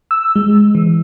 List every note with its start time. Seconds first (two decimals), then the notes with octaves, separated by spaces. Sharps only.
0.11 E6
0.36 G#3
0.75 E3